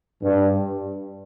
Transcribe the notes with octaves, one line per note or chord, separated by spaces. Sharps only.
G2